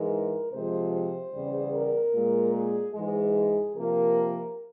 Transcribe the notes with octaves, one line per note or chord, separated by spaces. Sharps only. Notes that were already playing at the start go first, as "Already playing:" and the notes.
Already playing: G#2 E3 G#3 A#4
C3 F3 G#3 C5
C5
E2 C#3 G3
A#4
A#2 G#3
G#4
G#2 E3 G#3 G#4
C3 F3 A#3 A#4